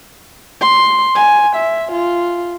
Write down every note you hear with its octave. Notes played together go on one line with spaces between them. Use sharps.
C6
G#5
E5
F4